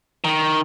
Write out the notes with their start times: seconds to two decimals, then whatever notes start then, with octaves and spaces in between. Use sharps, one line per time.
0.24 D#3